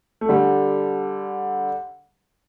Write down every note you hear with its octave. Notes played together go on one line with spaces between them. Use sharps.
A3
D3 G3